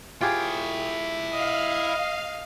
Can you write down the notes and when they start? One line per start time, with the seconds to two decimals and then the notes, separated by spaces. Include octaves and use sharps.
0.21 E4 F4 G4 G#4 G5
1.33 D#5 F5